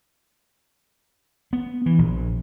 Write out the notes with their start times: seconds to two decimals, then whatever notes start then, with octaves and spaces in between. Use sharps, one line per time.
1.53 B3
1.86 E3
1.99 A#1